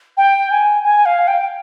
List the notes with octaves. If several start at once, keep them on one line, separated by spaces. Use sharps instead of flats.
G5
G#5
G#5
F5
G5